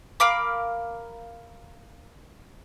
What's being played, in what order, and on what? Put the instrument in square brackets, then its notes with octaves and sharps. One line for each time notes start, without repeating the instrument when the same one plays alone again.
[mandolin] A#4 F5 B5 D6